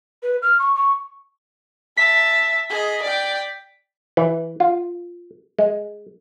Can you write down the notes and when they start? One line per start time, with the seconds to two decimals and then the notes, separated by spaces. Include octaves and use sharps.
0.23 B4
0.42 F6
0.59 C#6
0.75 C#6
1.97 E5 A5 B6
2.70 G#4 D#5
3.02 D5 G5
4.17 E3
4.60 F4
5.59 G#3